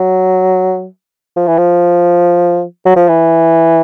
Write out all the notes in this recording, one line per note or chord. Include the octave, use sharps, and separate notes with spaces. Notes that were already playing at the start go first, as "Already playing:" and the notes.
Already playing: F#3
F3
E3
F3
F#3
F3
E3